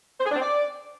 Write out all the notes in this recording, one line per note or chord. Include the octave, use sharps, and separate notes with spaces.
C5
G#4
D4
C4
D5